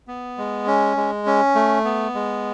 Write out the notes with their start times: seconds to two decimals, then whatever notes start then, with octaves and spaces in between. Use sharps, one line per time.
0.08 B3
0.38 G#3
0.67 C#4
0.97 G#3
1.26 C#4
1.55 A3
1.85 B3
2.14 G#3